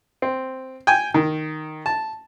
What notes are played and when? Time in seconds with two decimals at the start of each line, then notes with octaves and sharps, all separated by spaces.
0.22 C4
0.87 G5 G#5
1.14 D#3
1.86 A5